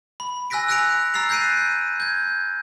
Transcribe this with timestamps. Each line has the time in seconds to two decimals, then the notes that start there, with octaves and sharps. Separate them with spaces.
0.20 B5
0.50 G#5 E6 F#6 A#6 B6 D7
0.68 E6 F#6 A#6 C#7 D7 F7
1.14 A#5 E6 A6 C7 F7
1.29 F#6 G6 A#6 C7 D7 D#7
2.00 G6 G#6